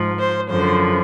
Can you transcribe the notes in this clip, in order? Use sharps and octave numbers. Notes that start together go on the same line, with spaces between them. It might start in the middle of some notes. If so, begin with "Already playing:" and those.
Already playing: G#2 F3
C5
F#2 D3 F3 C5